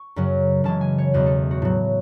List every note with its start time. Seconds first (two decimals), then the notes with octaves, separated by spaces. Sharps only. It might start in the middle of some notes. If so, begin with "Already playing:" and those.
Already playing: C#6
0.16 F#2 C#3 F#3
0.64 F#2 C#3 E3 G#3 A5
0.81 G#5
0.98 C#5
1.14 E2 B2 F#3 B4
1.26 A4
1.51 F#4
1.62 A2 F#3